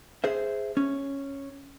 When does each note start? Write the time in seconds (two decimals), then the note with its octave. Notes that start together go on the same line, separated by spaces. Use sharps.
0.24 G#4 C5 E5
0.77 C#4